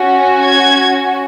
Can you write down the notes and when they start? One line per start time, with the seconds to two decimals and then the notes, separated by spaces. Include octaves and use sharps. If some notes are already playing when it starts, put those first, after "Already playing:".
Already playing: C#4 F#4
0.42 G#6